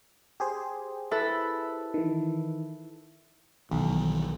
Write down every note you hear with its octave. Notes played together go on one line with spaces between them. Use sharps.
G4 G#4 C5
E4 A4 B4
D#3 E3
B1 B2 D#3 E3